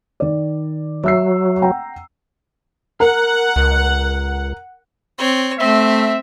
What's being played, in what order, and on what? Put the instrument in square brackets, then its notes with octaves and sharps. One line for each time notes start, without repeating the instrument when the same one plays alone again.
[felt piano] D#3 D5
[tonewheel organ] F#3 [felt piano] E5 E6 C7
[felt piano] F#5 G5 A#5
[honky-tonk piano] A#4 [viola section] F#5
[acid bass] C#2
[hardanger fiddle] C4 C#5
[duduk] A3 [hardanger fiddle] C4 [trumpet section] E5